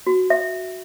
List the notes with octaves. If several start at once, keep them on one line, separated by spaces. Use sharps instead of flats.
F#4
E5